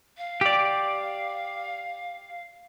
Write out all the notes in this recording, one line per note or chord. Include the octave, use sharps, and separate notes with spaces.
F5
G4 D5